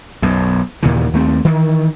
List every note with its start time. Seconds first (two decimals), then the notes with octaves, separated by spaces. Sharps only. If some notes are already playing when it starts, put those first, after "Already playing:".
0.22 B1 F#2
0.83 D#2 A#2 C#3 E3
1.13 D#2 A3 C4
1.45 D#3 E3